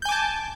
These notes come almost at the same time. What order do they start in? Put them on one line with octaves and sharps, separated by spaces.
G6 G#5 D6 A5